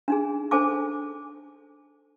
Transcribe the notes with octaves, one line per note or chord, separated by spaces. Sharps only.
D4 D#4 G#4
D4 A4 C5 G#5 A5 D6